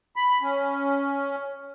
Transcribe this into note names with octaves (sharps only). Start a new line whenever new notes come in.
B5
C#4